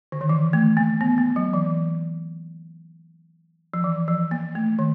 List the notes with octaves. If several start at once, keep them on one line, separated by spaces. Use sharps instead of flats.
D3
D#3
E3
A3
A#3
B3
A#3
F#3
E3
F3
E3
F3
A#3
A3
D#3